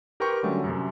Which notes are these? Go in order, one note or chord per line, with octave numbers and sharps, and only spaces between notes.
G4 A#4 B4 G5 C6 C#6
D3 F#3 G3 A3 C#4
F#2 C3